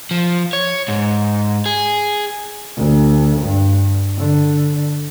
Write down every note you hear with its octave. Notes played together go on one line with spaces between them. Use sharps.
F3
C#5
G#2
G#4
D2
G2
D3